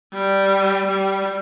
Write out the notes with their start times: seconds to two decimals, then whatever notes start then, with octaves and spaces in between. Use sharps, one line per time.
0.13 G3
0.88 G3